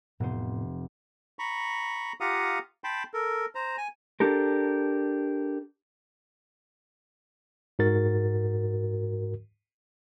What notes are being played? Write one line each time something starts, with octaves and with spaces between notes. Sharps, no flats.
F1 A2 B3 C5
A#5 B5 C#6
F4 G4 F5 F#5 A#5 D#6
G5 A5 B5 C6
A4 A#4
C5 A#5
G#5
D4 G4 A4 A#4
G#2 F#4 A#4 A6